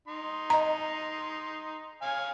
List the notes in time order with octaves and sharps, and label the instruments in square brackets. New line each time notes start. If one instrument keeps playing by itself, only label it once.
[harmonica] D#4 C6
[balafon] D#5 A#5
[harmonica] C#5 F5 G#5